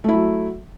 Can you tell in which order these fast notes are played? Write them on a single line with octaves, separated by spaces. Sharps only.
A3 E4 F#3